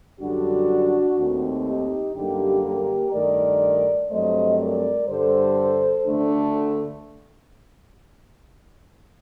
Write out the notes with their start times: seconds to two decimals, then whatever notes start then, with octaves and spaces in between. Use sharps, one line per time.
0.19 F#2 D3 G3 D4 F#4
1.17 D#2 D#3 A3 C4
1.66 D#4 G4
2.15 F#2 D3 G3 A#3 D4 D#4 G4
2.63 G4 A#4
3.12 G2 D#3 A3 A#4 D5
4.10 G2 F#3 A3 C4 C5 D#5
4.59 A#4 D5
5.08 G2 D3 G3 A4 C5
6.06 D2 D3 A3 D4